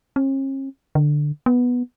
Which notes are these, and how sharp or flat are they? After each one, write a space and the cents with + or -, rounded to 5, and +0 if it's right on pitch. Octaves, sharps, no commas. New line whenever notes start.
C#4 -45
D3 +10
B3 -5